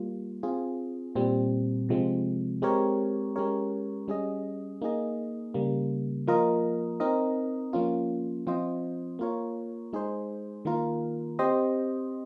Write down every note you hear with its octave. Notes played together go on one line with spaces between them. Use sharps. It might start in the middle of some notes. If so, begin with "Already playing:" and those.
Already playing: G3 A#3 F4
C4 F4 G#4
A#2 G3 C4
C3 F3 G#3 C4
G#3 C4 G4 A#4 C#5
G#3 C#4 G4 A#4 C#5
G3 C#4 G#4 D#5
A#3 D#4 G#4 D#5
C#3 G3 A#3
F3 A#3 F4 A#4 D#5
C4 D#4 A#4 D#5
F3 A#3 C#4 F4
F3 C4 F4 C5 D#5
A#3 F4 A#4 C#5
G#3 D#4 G#4 C5
D#3 A#3 F4 A#4
C4 G4 C5 D#5